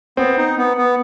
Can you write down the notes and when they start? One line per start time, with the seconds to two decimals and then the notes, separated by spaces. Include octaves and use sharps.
0.17 B3 C4
0.37 D#4
0.57 B3
0.77 B3